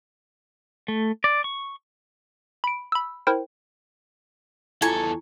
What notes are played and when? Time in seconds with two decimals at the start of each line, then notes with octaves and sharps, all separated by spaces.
0.88 A3
1.24 D5
1.44 C#6
2.64 B5 D7
2.92 B5 E6
3.27 E4 A#4 C5 G5
4.82 E2 E4 F4 A4 G#5 C#6